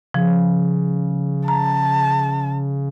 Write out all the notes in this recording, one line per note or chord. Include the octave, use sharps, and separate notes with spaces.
C#3 F3
A5 A#5